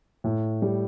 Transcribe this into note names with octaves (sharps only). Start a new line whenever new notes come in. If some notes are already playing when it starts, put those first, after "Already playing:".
A2
G3